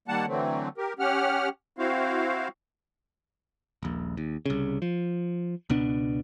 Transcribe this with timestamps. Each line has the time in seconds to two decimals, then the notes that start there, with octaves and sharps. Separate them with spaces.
0.08 D#3 G3 A#3 F#5 A5
0.27 D3 E3 F#3 A3 C4
0.78 G4 A#4
0.99 C#4 G4 F#5 F6
1.78 C4 E4 F#4 C5 F5
3.83 D#1 A#1
4.17 D#2
4.46 C2 C#3
4.82 F3
5.70 C#2 B2 B3 D4